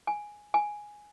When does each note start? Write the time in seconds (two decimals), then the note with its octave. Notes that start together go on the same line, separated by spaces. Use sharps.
0.07 G#5
0.54 G#5